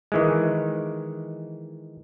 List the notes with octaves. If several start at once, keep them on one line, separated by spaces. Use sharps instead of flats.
D#3 E3 G#3